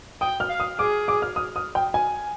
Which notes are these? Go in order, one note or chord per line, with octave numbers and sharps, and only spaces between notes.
G5 D#6
F6
F5
D#6
G#4 D6
D6
F6
D#6
D#6
G5
G#5